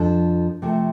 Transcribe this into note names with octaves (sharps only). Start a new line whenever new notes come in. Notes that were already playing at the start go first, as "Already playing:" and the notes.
Already playing: F2 F3 D4 A4
C3 F3 A3